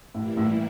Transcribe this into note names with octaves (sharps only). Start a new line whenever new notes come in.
A2 E3 G3 A#3 E4
A2